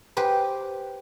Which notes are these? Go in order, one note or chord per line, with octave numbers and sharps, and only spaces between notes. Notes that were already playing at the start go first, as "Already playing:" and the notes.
G4 B4 C5